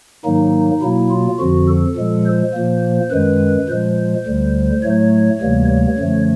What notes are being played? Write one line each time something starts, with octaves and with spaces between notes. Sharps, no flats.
G#2 D#3 F#3 A#3 D#4
B2 F#3 A#3 E4
F4
F2 D3 F3 F#4
A4
A#2 F3 G#3
C5
A#2 F3 A#3
F#2 D#3 G#3 B4
A#2 F3 G#3 C5
D2 D3 G3
A2 F#3 A3 C#5
D2 C3 E3 G3 A#3
C#5
F#2 D3 F3 A3